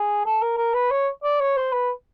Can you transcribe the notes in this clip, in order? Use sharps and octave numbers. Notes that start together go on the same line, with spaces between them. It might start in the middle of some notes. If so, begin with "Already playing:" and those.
Already playing: G#4
A4
A#4
A#4
B4
C#5
D5
C#5
C5
B4